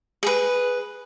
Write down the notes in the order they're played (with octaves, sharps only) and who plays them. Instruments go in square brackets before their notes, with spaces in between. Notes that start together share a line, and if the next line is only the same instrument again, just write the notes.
[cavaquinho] G#4 B4